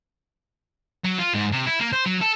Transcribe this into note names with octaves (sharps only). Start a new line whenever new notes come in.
F#3
F4
G#2
C3
E4
A#3
C5
F#3
A4